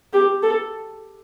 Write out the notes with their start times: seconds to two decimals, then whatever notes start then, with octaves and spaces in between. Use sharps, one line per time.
0.13 G4
0.43 A4